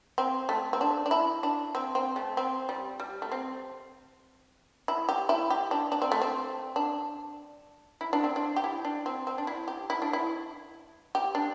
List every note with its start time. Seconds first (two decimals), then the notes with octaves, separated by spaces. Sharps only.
0.18 C4
0.49 A3
0.73 C4
0.81 D4
1.06 D4
1.11 E4
1.43 D4
1.75 C4
1.95 C4
2.16 A3
2.37 C4
2.69 G3
3.00 G3
3.22 A3
3.32 C4
4.88 E4
5.09 G4
5.29 E4
5.50 G4
5.71 D4
5.92 D4
6.02 C4
6.12 A3
6.22 C4
6.76 D4
8.01 E4
8.13 D4
8.24 C4
8.36 D4
8.56 G4
8.64 E4
8.85 D4
9.06 C4
9.27 C4
9.38 D4
9.47 E4
9.68 G4
9.90 E4
10.02 D4
10.13 E4
11.15 G4
11.35 D4